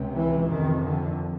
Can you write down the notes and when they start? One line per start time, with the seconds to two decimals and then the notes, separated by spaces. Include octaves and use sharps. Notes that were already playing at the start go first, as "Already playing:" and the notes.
Already playing: C#2 C3
0.17 E3
0.49 F2 C3 D#3
0.84 D3